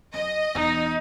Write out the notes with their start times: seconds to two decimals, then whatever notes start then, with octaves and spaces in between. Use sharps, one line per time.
0.14 F#2 D#5
0.55 E1 E3 D#4